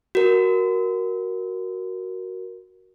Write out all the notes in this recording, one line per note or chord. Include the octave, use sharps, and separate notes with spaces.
F#4 A#4